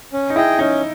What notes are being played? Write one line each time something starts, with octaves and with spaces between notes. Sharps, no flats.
C#4
D#4
E4 G#4 D#5 G5
C#4 D#4